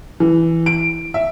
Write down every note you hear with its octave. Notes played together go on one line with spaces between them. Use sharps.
E3
D7
E5